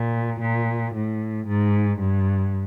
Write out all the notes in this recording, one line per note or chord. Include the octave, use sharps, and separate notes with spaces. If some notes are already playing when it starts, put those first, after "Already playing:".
Already playing: A#2
A#2
A2
G#2
G2